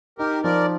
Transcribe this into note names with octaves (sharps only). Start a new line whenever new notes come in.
D#4 G4 A#4
F3 A#4 D5